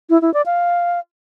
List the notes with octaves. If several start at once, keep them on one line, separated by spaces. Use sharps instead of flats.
E4
E4
D5
F5